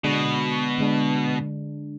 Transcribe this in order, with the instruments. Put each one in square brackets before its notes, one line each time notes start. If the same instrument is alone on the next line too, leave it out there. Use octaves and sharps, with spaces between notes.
[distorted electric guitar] B2 [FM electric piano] D3 G#3 D4
[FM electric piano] D3 G#3 D4